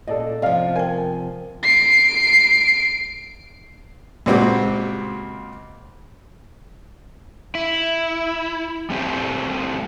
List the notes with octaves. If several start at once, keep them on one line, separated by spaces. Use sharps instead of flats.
A#2 A4 D5 D#5
C3 F3 D5 D#5 F5
A#4 G5 G#5
C7 D7
C#2 A#2 C4 F#4 G4
E4
G3 A3 C4 G4 A4